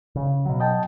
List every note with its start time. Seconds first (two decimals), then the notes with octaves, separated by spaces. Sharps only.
0.16 C#3
0.45 B2 F#3
0.60 D#5 G5 A5